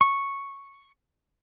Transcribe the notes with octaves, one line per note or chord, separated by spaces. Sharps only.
C#6